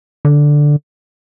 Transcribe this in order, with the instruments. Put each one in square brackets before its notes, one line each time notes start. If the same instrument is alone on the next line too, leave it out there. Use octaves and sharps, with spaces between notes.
[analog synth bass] D3